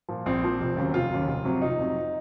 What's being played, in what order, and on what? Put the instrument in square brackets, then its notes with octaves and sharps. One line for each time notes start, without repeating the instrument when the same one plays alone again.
[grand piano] A#2 F3
A#1 C4
A#2 F3
F1
D#2 C#3 F#3
F1 F4
D#2 C#3 F#3
F1
F2 C3 F#3
F1 D#4
F2 C3 F#3